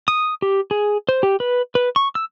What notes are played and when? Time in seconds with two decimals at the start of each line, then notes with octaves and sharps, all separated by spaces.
0.08 D#6
0.42 G4
0.71 G#4
1.09 C5
1.23 G4
1.40 B4
1.75 B4
1.96 C#6
2.15 E6